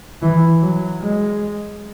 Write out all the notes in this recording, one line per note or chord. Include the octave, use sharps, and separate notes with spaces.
E3
F#3
G#3